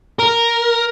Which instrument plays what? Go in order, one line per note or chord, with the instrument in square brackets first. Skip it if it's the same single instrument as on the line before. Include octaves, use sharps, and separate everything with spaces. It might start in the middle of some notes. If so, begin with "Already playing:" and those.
[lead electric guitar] A#4